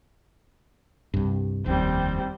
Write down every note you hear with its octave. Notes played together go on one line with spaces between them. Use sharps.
C2 G2
F1 D#2 G3 C4